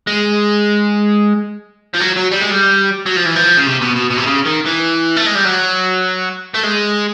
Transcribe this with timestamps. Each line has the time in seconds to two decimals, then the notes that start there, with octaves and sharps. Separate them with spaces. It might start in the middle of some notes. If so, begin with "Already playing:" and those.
0.07 G#3
1.95 F3
2.01 F#3
2.17 F#3
2.32 G3
2.41 G#3
2.51 G3
3.06 F#3
3.16 F3
3.26 E3
3.36 F3
3.57 C#3
3.67 C3
3.82 B2
3.96 B2
4.10 B2
4.18 C3
4.26 C#3
4.45 D#3
4.66 E3
5.16 A3
5.26 G#3
5.35 G3
5.45 F#3
6.55 A3
6.64 G#3